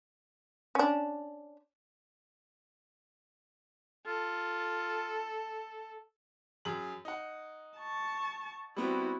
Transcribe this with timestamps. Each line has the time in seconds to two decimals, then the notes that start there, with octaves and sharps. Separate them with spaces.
0.75 C#4 D4
4.07 F4 A4
6.65 F#2 G#4 F#7
7.05 D#4 F#5
7.78 A5 C#6
8.77 G3 B3 C4 E4 F#4